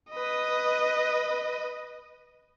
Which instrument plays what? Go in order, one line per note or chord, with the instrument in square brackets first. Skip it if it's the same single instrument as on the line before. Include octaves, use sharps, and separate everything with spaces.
[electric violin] B4 D#5